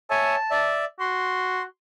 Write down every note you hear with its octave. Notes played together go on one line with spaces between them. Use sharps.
C#5 E5 G#5 A5
D5 E5
F#4 C6